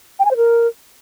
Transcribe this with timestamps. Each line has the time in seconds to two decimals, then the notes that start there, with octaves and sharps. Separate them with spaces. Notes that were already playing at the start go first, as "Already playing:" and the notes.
0.19 G5
0.25 G#5
0.31 C5
0.37 A#4